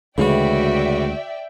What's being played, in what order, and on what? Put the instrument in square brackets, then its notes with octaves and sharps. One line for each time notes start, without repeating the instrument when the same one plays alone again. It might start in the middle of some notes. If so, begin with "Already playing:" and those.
[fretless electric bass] D2 G#3 [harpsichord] C#3 E3 [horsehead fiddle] F#4 [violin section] D5 E5 G5